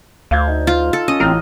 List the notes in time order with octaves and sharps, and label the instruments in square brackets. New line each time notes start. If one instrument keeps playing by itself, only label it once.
[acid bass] D2 [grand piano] F5 G6 G#6
[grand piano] D#4
[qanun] F4
A4
[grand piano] C#4 [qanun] D#5
[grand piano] A1 A#5 F6 [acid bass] C4